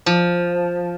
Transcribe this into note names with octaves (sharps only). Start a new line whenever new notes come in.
F3